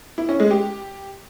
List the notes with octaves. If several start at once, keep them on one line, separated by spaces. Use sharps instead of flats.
E4
C#4
G#3
G4